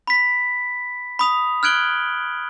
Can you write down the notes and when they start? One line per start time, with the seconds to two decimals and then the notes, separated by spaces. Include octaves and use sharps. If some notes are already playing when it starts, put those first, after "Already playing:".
0.07 B5 B6
1.19 B5 D#6 F7
1.63 F6 F#6 G#6 D7 F#7 G7